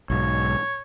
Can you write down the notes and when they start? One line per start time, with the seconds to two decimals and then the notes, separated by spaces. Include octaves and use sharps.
0.10 B1 G#2 C#5